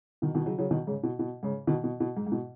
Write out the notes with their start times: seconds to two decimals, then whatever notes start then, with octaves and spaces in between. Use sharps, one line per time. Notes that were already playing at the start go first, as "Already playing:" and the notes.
0.22 B2 D#3
0.35 B2 D#3
0.46 C#3 F#3
0.59 C#3 F#3
0.71 B2 D#3
0.87 G#2 C#3
1.03 B2
1.19 B2
1.43 G#2 C#3
1.67 B2 D#3
1.84 B2
2.00 B2
2.17 G#2
2.27 G#2
2.32 B2